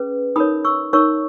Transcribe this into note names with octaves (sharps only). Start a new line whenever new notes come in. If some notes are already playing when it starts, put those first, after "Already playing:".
Already playing: C#4 G#4 B4
D#4 A#4 C#5 B5 D#6
C#6 E6
D#4 A#4 C#5 C#6 E6